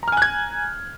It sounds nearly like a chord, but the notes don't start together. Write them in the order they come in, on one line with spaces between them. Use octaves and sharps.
A#5 F6 G#5 F#6 G#6